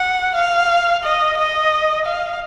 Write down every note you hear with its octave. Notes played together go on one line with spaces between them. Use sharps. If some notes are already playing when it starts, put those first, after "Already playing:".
Already playing: F#5
F5
D#5
D#5
F5